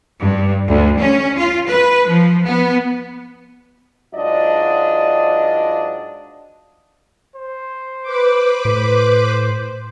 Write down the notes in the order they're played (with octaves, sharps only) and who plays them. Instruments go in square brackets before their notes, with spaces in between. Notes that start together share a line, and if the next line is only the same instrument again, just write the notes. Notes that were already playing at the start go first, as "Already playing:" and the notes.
[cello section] G2
D2
C#4
F4
B4
F3
B3
[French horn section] G#2 F#3 D4 F4 D5 D#5
[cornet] C5
[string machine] B4 D6
[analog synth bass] A2